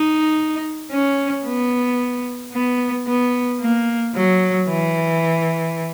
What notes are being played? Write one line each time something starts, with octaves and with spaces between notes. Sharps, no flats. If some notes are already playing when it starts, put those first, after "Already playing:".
Already playing: D#4
C#4
B3
B3
B3
A#3
F#3
E3